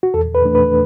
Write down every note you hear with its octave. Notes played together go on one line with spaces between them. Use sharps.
F#4
E2 A4
B4
E3 A3 D4
B4